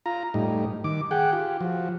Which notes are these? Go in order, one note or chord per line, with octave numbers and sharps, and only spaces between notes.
F4 A#5
A2 G3 D#4
D#3 D6
G#4 F#5 G5
F4 G4
F3 F#4